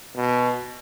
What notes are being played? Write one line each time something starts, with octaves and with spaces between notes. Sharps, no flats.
B2